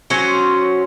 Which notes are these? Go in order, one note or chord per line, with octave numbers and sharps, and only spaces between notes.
F#3 C#4 F#4 C5